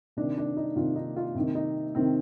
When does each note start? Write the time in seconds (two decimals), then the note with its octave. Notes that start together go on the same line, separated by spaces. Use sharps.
0.17 C3 D#3 D4
0.37 D4
0.57 D#4
0.76 C3 D#3 F4
0.96 D#4
1.16 F4
1.35 C3 D#3
1.55 D#4
1.95 C3 D#3 C4